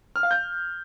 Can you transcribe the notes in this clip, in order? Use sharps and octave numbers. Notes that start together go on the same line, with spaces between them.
F6
F5
G6